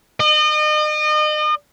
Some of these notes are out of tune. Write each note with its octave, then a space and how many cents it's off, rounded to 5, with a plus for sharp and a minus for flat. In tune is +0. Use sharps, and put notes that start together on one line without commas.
D#5 -35